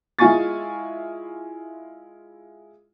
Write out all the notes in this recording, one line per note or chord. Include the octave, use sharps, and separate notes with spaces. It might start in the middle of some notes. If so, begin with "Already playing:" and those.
G#3 E4 F4 G#5 C#6 A6